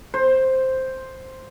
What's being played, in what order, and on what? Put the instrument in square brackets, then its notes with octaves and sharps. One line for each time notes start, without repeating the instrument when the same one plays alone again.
[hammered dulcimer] C5